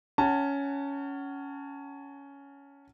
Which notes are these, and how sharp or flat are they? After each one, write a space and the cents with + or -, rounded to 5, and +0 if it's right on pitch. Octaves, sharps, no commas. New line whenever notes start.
C#4 +10 F#5 +30 A5 +30